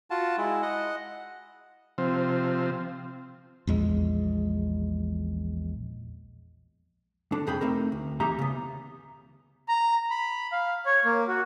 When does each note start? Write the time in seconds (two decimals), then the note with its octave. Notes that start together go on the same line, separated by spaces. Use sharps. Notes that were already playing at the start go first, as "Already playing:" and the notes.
0.11 F4 F#4 A5
0.38 G#3 E4
0.62 D#5 F#5
1.98 C3 F3 C4
3.67 A#1 E2 G#3
7.32 D3 D4
7.47 F2 C3 G#4 G5 B5
7.61 A3 C4 D#4 A#4
7.92 D2
8.20 E3 A#3 D#4 G4 E5 A#5
8.39 C#3 B3
9.69 A#5
10.10 B5
10.52 F5
10.86 C#5
11.05 A#3
11.28 F#4